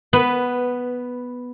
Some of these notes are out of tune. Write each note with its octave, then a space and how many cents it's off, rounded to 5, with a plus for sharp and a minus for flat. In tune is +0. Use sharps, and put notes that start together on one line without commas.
B3 +0 B4 +15